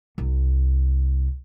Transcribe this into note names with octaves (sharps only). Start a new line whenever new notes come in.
C2